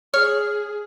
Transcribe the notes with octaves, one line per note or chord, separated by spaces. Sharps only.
G#4 C#5 F6